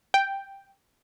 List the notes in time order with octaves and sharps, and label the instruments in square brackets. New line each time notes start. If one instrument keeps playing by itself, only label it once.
[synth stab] G5